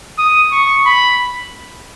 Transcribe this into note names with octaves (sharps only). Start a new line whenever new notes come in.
D#6
C#6
B5